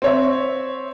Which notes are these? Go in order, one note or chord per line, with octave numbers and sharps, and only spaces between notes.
C4 C#5 E5